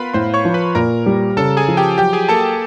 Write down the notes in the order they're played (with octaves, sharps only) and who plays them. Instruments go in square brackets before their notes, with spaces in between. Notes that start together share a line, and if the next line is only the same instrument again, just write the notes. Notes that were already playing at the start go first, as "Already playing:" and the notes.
Already playing: [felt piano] B3 [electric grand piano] F4 A#4 B4 F5 B5
[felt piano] A2 [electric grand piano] C5 C6
[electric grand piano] C#5 C#6
[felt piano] F3
[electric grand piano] B4 B5
[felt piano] A#2 [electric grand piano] A#4 A#5
[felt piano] G3
[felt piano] C#3 [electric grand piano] A4 A5
[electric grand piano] G#4 G#5
[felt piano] F3
[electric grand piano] G4 G5
[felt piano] F#3 [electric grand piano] G4 G5
[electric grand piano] G#4 G#5
[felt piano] A#3 [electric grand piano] A4 A5